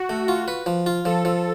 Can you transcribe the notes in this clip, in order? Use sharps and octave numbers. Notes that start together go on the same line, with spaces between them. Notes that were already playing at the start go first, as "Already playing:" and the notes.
Already playing: F#4
A3
F4
B4
F3
F4
F3 A4
F3